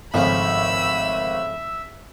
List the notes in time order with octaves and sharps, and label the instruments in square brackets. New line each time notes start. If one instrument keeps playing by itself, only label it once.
[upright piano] G#1 [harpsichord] A2 C#3 F3 [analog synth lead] E5 [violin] B5 E6